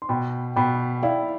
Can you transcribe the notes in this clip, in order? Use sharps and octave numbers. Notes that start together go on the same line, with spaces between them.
C6
B2 G5 B5
B2 G5 B5
E4 D5 F5